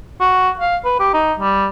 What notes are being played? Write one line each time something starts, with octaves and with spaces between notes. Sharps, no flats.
F#4
F5
B4
G4
D#4
G3